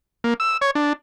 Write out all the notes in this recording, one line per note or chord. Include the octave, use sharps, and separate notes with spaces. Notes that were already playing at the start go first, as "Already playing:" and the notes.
A#3
E6
C#5
D4